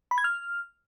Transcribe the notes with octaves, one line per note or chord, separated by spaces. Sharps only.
B5
G#6
F6